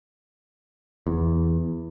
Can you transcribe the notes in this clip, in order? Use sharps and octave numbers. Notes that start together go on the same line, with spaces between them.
E2